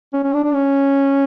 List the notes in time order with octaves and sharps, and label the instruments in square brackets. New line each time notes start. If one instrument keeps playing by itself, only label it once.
[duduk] C#4
C#4
D4
D4
C#4